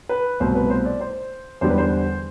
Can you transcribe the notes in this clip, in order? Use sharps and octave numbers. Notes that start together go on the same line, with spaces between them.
B4
C2 B2 A3 C5
B4
C5
D5
C5
E2 D3 G3 C5
B4
C5